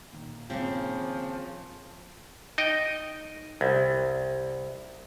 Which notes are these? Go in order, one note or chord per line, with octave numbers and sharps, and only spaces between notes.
A#2 D#3
C#3 F3 A#3 C4
D#4 D#5 G5
C2